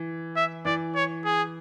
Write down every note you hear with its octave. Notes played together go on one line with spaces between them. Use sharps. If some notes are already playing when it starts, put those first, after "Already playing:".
Already playing: E3
E5
E3 D5
C#5
G#4